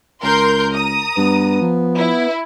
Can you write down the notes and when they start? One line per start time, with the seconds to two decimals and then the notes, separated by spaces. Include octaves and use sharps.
0.23 C#2 A#4 C6 G6
0.74 A#5 D#6
1.17 G2 B3
1.61 F3
1.97 E4